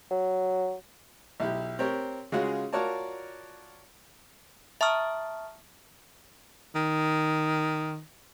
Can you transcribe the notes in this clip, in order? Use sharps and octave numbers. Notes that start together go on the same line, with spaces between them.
F#3
B1 E4 G4
C4 G4 A#4 C#5
C#3 G#3 C#4 F4 F#4 G#4
F4 F#4 A#4 C#5 D5 A5
E5 A5 A#5 C#6 D#6 F6
D#3